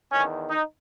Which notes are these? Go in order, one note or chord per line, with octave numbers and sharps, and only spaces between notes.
E2 D#3 C#4
D#4